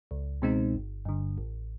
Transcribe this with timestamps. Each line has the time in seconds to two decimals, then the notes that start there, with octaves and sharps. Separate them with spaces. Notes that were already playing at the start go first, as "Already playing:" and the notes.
0.11 C#2
0.42 B2 G#3 C4 D#4
0.74 G1
1.05 G2 D3
1.38 A1